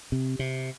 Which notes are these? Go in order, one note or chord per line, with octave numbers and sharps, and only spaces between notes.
C3
C3